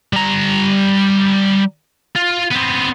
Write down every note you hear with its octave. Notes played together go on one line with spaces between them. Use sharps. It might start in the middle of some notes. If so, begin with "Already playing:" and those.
G3 A#5
F4
B3 C4